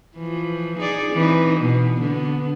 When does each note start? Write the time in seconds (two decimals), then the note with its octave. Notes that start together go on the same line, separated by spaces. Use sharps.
0.17 E3 F3
0.79 D#4 G#4 D5
1.13 E3 C4 D#4
1.61 B2
2.01 D3 B3